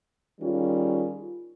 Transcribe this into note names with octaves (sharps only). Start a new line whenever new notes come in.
D#3 G3 C#4 F4 G#4